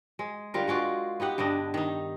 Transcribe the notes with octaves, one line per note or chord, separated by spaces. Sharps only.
G#3
D3 G3 F4 A#4
G#3 F4 F#4 D5
B3 D#4 G4 F#5
G2 D3 D4 D#5
D#3 D#4